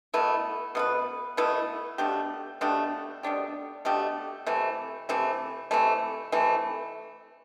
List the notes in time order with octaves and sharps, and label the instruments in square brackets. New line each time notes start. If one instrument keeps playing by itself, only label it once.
[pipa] B2 A3 E4 B4
B2 A3 E4 B4
B2 A3 E4 B4
B2 A3 D4 G4
B2 A3 D4 G4
B2 A3 D4 G4
B2 A3 D4 G4
C3 E3 A3
C3 E3 A3
C3 E3 A3
C3 E3 A3